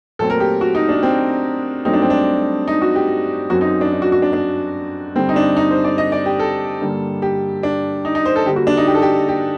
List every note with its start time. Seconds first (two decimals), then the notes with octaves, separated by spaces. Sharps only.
0.19 A#2 F#3 A3 C4 A4
0.30 A#4
0.40 G4
0.61 F#4
0.75 D#4
0.89 D4
1.03 C4
1.85 G2 F#3 A3 C4 D#4
1.93 D4
2.02 C4
2.10 D4
2.68 D#4
2.82 F#4
2.95 G4
3.50 F#2 F#3 C4 F#4
3.61 D#4
3.81 D4
3.92 D#4
4.02 F#4
4.12 F#4
4.22 D4
4.33 D4
5.15 G2 D3 G3 C4
5.29 D#4
5.36 D4
5.57 D#4
5.71 C5
5.84 D5
5.98 D#5
6.12 D5
6.26 G4
6.39 A4
6.81 G2 D3 G3 A#3
7.22 G4
7.63 D4
8.05 D#4
8.15 D#4
8.25 C5
8.36 A4
8.46 D3 G3 A#3 G4
8.56 F#4
8.67 D4
8.77 D#4
8.87 G4
8.94 A4
9.02 G4
9.29 G4